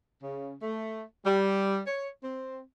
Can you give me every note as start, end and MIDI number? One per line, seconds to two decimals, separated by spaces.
0.23 0.55 49
0.62 1.02 57
1.25 1.78 55
1.86 2.08 73
2.22 2.60 60